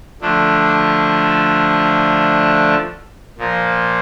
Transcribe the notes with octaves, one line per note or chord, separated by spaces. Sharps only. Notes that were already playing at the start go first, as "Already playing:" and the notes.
D3 F3 A3 D4
A#2 F3 A#3